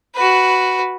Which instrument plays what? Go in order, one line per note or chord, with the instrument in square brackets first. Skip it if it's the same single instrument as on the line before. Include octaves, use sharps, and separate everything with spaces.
[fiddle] F#4 B4